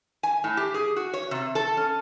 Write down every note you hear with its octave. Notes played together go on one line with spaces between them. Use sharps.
G#5
A2
G4
G#4
F#4
C#5
C3
A4
C#4